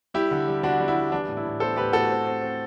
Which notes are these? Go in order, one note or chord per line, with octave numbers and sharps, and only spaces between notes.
G3 E4 G4
D3
G3
D3 D4 F#4
G3
E4
G3
E3 D4
A2
E4
A2
B3 A4 C5
A2 G4 B4
A2 F#4 A4
C4
C4
C4